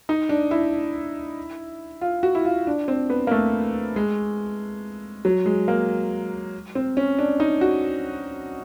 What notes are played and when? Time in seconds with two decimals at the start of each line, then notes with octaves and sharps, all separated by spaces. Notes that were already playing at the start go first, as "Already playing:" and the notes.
0.09 D#4
0.29 D4
0.51 E4
2.01 F4
2.23 F#4
2.35 E4
2.45 F4
2.67 D4
2.88 C4
3.10 B3
3.27 A#3
3.31 A3
3.96 G#3
5.25 F#3
5.46 G#3
5.68 A#3
6.75 C4
6.97 C#4
7.19 D4
7.40 D#4
7.61 F#4